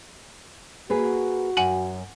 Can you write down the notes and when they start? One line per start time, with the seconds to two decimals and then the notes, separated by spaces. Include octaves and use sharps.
0.90 A#3 F#4 G#4 B4
1.57 F#2 F#5 G#5 F#7